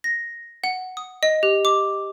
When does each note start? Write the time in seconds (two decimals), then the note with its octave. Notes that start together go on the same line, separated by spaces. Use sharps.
0.04 A#6
0.64 F#5
0.97 D#6
1.23 D#5
1.43 G4
1.65 D6